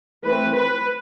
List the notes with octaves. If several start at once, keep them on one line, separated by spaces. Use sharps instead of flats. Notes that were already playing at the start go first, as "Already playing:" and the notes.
E3 A3 C4 B4
B4